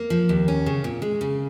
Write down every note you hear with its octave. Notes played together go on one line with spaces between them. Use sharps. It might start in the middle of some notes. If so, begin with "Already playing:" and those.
Already playing: A#3
F3
D#2
C#4
C#3
A#2
G#3
C#3